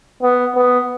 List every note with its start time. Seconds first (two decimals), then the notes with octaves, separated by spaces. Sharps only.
0.23 B3
0.56 B3